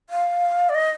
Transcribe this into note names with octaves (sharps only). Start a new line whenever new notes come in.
F5
D5
D#5